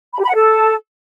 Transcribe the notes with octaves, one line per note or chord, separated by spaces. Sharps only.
B5
G4
B5
F#5
A4